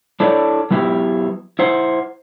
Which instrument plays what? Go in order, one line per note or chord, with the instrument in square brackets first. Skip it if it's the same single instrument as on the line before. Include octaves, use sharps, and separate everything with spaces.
[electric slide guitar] D4 E4 A4 C#5 D5
F#3 B3 E4 G4
E4 C5 F#5